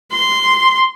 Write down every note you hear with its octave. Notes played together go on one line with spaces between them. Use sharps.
C6